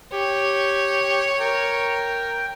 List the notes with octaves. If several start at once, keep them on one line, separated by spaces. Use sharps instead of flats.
G4 C#5
A#4 G5